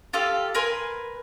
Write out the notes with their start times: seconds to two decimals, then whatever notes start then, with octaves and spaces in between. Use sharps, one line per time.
0.13 F4 G4 A4 F5
0.55 A#4 B4 G#5 C6